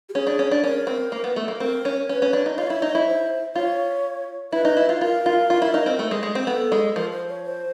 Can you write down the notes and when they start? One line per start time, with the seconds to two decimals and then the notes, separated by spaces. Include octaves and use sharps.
0.09 G4
0.14 C#4 G#4
0.27 D4
0.39 C#4
0.51 D4
0.64 C#4 A#4
0.87 C4
1.12 A#3
1.24 B3
1.36 A3
1.48 A#3
1.60 C4 A#4
1.85 C#4
2.09 C#4 B4
2.22 C#4
2.33 D4
2.46 D#4
2.58 F4 C#5
2.70 E4
2.82 D#4
2.95 E4
3.07 C5
3.55 F4 C#5
4.52 E4 B4
4.65 D#4
4.77 E4
4.89 F4
5.01 F4 A#4
5.26 F4
5.50 F4
5.62 E4
5.74 D#4
5.86 C4
5.99 A3
6.11 G#3
6.23 G#3
6.35 C4
6.47 B3 A4
6.72 G#3
6.96 F3 A#4
7.12 C5
7.29 C#5
7.45 C5